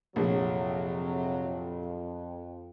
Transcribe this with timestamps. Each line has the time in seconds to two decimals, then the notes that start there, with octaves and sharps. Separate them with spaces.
0.16 A#1 F2 C3 F#3